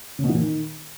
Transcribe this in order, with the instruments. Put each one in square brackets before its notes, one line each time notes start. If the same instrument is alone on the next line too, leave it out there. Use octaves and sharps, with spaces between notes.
[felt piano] C#3
B2
E3
A#2
D#3